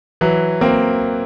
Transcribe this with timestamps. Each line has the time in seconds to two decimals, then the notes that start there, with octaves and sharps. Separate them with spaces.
0.21 E3 F#3
0.61 A#3 C4